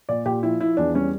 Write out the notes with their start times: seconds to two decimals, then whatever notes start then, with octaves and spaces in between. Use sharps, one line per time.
0.09 A#2 D5
0.25 A#2 G4
0.43 F3 E4
0.60 F3 E4
0.77 E2 D4
0.94 G3 C#4